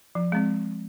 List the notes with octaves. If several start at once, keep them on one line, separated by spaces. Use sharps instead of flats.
F3
G#3 C4